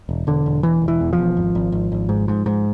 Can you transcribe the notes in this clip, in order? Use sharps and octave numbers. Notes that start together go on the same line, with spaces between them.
E1
E1 D3
E1
E1 E3
E1
E3
E2
F3
E1
G#1
G#1
G#1
G#1
G#2
G#2
G#2